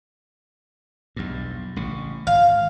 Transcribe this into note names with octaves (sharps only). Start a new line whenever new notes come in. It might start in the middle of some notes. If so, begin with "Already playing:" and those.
B1 E2 G2
A1 C#3
G#1 F5